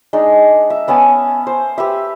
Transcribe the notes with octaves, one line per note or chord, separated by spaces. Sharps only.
G#3 D4 D#4
E5
B3 C#4 G#5 A5
C5
G4 B4 E5